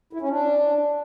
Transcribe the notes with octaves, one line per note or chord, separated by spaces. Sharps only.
E4
C#4
D4